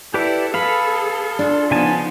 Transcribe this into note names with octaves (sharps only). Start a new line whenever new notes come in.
E4 G4 A4 B4 D5
G#4 B4 F5 B5
D4 F4
C#3 F3 B3 D#4 G#5 A5